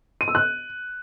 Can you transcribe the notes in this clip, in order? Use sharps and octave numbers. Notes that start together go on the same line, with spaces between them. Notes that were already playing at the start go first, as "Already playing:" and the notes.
D#7
E6
F#6